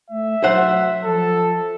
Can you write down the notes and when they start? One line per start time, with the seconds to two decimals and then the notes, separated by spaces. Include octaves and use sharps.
0.10 A3 E5
0.44 F#3 C5 F#5
1.04 F3 A4